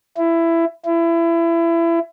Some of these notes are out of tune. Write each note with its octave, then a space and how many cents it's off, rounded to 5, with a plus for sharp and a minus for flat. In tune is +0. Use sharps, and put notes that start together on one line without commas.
E4 +15
E4 +25